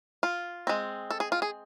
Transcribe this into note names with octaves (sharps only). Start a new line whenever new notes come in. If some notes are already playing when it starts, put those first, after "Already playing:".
F4
G#3 C4
A4
G#4
F4
G#4